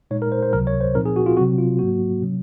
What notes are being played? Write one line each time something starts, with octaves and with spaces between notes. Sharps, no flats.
A#2 G#3 D#4 C#5
A#4
C5
C5
C#2 C3 F#3 A#4
C#5
C5
A#2 F3 C4 D#4 A#4
G#4
F#4
F4
C3 F#3 C4 F#4
F4
G#2 F#3 A#3 F#4
C3 F#3 C#4